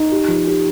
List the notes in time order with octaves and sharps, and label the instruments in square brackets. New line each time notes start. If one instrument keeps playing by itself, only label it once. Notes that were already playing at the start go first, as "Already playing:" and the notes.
Already playing: [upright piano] D#4
G4
F3
G4